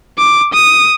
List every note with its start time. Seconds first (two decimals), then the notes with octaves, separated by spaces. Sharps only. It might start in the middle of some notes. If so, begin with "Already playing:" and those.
0.18 D6
0.54 D#6